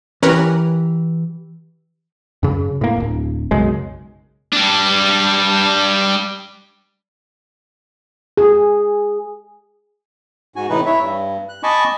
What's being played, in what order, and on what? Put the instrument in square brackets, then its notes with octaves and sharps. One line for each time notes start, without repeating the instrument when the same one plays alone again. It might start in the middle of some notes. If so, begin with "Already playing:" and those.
[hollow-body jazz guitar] E3 G4 [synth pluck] C#4 A#4 B4
[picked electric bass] F#2 C#3
A2 A#3
D1 G1
B1 F#2 C#3 G#3
[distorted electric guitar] G3 D4
[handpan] G#4
[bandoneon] G#2 F#4 G#5
A2 C3 E3 D#4 B4
E4 C#5 E5
G2
F#6
D#5 G#5 A5 B5 C#6 D6